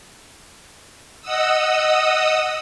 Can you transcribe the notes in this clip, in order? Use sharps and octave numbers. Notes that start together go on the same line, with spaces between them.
D#5 F#5 D#6 E6